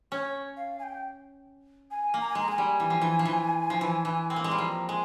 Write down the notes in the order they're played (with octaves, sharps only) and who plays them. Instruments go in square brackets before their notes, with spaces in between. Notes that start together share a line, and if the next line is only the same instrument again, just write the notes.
[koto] C#4 [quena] C#5
[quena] F5
G#5
G5
G#5
[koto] A#3
[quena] A#5
G#5
[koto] G#3 [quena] A#5
[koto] G#3 [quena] G#5
[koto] G3
E3
F3
E3
F3
E3
F3
E3
E3
C4
A#3
G#3
G3
[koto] F3 [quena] A#5
[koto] G#3 [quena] G#5